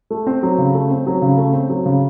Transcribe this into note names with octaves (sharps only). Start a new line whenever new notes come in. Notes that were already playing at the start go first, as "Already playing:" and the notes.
A3
C4
F#3
C#3
A3
C4
F#3
C#3
A3
C4
F#3
C#3